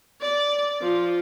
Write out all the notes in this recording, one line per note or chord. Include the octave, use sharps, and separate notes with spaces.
D5
F3